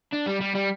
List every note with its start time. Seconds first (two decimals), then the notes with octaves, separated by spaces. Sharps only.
0.12 D4
0.26 G3
0.40 G3
0.55 G3